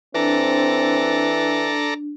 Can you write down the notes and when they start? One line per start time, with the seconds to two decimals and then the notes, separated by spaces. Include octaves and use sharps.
0.15 E3 C4 D4 A4 D5 A#5